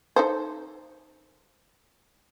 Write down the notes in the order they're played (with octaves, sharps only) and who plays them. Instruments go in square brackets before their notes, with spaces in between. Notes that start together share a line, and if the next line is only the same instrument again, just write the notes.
[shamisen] D#4 A4 C5